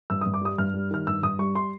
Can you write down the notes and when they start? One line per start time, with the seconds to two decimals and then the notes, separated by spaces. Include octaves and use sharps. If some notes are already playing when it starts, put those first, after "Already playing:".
0.10 G2 E6
0.21 G2 D#6
0.34 D6
0.41 G3 D#6
0.58 G2 F6
0.74 G3
0.91 D#3 F6
1.07 G2 E6
1.23 G2 D#6
1.39 G3 C#6
1.55 C6